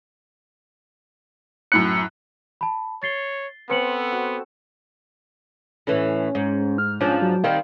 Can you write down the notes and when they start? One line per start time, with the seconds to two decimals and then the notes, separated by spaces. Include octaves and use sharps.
1.72 F#2 A2 F#6 C#7
2.61 A5 B5
3.03 C#5 A6 C7 G7
3.70 B3 C4 A4 B4 C5 C#7 F#7
4.12 F#4
5.87 A2 E3 C#4
6.35 G#2
6.78 F6
7.01 G#2 F3 C#4 D4
7.22 F#3
7.44 D#3 G3 C4 F5